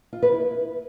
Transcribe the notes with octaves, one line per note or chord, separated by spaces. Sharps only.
F4
B4
E4